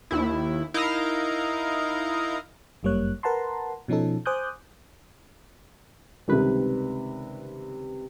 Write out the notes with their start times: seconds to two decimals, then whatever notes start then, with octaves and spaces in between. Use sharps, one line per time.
0.11 D#2 E4
0.74 D#4 E4 A#4 D#5 F5 A#5
2.83 G1 F#2 G3 A#3 C#5 F#6
3.23 A#4 B4 F#5 A5 A#5 C6
3.88 B2 F3 C#4 D#4 A4
4.26 C5 G#5 D6 D#6 F#6 G6
6.28 C#2 C3 D#3 G3 B4